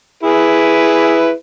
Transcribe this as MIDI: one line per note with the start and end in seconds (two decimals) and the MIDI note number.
0.23 1.32 64
0.23 1.32 68
0.23 1.32 71